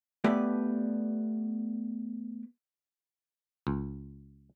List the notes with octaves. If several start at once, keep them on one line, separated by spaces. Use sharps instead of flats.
A3 B3 G4 B4 D5
C#2